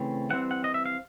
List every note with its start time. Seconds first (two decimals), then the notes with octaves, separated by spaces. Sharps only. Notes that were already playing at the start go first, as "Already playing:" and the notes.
Already playing: C#3 E3 A3 C4
0.30 E3 G3 C4 F#5
0.51 F#5
0.64 D#5
0.74 E5
0.86 F5